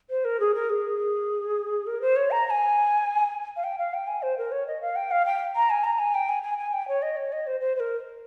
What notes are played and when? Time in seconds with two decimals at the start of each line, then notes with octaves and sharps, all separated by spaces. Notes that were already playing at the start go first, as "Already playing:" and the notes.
0.10 C5
0.25 A#4
0.40 G#4
0.55 A#4
0.70 G#4
1.87 A#4
2.02 C5
2.16 C#5
2.31 A#5
2.46 A#5
2.50 G#5
3.56 F5
3.64 G5
3.78 F5
3.94 G5
4.07 G#5
4.22 C5
4.38 A#4
4.52 C#5
4.67 D#5
4.81 F5
4.96 G5
5.11 F5
5.26 G5
5.55 A#5
5.70 G#5
5.84 A#5
5.99 G#5
6.15 G5
6.29 G#5
6.43 G#5
6.58 G#5
6.73 G5
6.88 C#5
7.02 D#5
7.17 C#5
7.32 D#5
7.47 C5
7.61 C5
7.76 C5
7.80 A#4